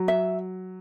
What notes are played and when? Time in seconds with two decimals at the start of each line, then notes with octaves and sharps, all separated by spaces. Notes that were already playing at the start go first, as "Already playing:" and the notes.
Already playing: F#3
0.08 E5